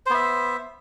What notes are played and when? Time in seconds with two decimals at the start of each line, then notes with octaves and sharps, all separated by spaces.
0.06 C5
0.10 B3
0.14 E5